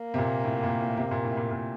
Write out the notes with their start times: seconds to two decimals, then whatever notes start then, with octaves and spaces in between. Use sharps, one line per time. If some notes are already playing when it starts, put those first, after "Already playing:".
Already playing: A#3
0.14 C3
0.18 A#2
0.45 A2
0.63 A#2
0.80 A2
0.98 C3
1.11 A#2
1.24 A2
1.37 A#2
1.51 A#2